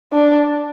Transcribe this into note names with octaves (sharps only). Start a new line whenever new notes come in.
D4